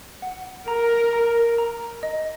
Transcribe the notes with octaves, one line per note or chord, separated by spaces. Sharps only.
F#5
A#4 A#5
A#5
A#5
D#5